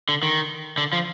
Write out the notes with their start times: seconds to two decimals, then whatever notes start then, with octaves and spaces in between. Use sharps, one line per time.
0.09 D3
0.23 D#3
0.78 D3
0.93 F3